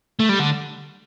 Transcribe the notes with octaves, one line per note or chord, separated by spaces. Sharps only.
A3
G3
D3